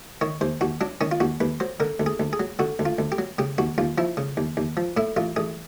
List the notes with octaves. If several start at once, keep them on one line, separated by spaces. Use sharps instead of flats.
D#3 C#5
D#2 C5
D#2 F#4
F#3 D4
D#3 C#4
F4
D#2 F#4
D#2 B4
F#3 C5
D3 A#4
D2
G#4
D2
G#4
F#3
D3 F#4
D2
F4
D2
G4
F#3
C#3 G4
D#2 F#4
D#2 F4
F3 E4
C#3
D#2
D#2
F3
A2 E4
A1 F4
A1 G#4